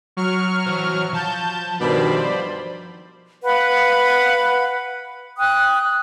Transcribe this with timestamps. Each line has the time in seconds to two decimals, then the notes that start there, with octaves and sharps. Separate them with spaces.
0.17 F#3 C#6 F6
0.67 E3 C5
1.14 F3 A5 G6
1.80 G2 B2 D#3 C5 D5 B5
3.44 B4 F5 F#5 B5
5.38 G5 D#6 F#6